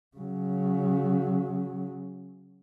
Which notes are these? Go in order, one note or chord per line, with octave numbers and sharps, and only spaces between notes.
C#3 F#3